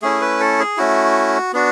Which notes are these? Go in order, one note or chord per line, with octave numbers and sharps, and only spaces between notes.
A3 C#4 E4 G#4
B4
A4
G#4
A3 C#4 E4 F#4
B3 D4 F#4